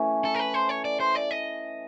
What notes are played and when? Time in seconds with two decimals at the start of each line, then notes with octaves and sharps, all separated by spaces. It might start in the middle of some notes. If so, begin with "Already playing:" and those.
Already playing: E3 A3 C#4
0.25 A4
0.34 A#4
0.39 B4
0.54 C5
0.69 C#5
0.85 D5
1.00 C5
1.15 D5
1.31 D#5